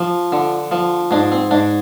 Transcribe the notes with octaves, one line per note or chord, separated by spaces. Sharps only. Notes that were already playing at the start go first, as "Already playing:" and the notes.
Already playing: F3
D3
F3
G#2 D4
C4
G#2 D4